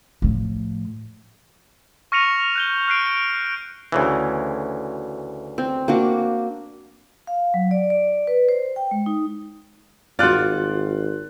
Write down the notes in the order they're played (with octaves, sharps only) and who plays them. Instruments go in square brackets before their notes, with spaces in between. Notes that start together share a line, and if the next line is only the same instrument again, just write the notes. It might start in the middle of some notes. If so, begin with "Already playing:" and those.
[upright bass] A2 F3
[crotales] C#6 F6 A#6 C#7 D#7 F7
F#6 G6 G7
F6 F#6 C7 D7
[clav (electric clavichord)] D2 C#3 E3
[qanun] C4
A#3 D4 F#4
[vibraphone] F5
F#3
D5
D5
B4
C5
G5
G#3
D#4
[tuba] G#1 [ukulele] F4 [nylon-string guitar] F#4 D5 [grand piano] C6 F#6 A6